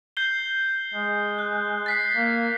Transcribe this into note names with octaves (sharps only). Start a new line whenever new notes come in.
G6 C7 G7
G#3
F#6
A6 B6 C7
A#3